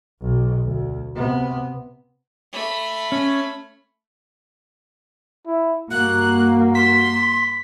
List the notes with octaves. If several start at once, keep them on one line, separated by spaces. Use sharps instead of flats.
B1
D2
C3 B3
A3 B5
C#4
E4
G2 A#3 F#4 F#6
C6 B6